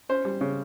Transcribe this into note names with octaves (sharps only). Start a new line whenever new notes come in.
C#4 C5
G3
C#3